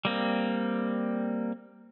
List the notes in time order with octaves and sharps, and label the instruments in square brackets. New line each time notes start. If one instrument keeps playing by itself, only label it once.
[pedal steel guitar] G3 A#3 C4